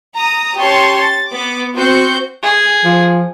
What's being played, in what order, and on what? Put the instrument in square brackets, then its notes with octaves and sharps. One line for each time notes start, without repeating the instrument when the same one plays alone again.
[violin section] A#5 D#6
C#4 G4 C#5 A5 C6 C#6
A6
B3 D6
C4 F#4 C5 G6 C#7
[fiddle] G#4
[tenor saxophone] F3